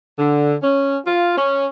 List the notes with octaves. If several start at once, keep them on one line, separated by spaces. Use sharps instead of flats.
D3
C#4
F4
C#4